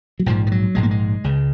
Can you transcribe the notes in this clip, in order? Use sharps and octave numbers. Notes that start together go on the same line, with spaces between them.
F#3
A#1 G#2 F3
F3
F#3
A#1 G#2 G#3
A#3
G#3
C#2 C#3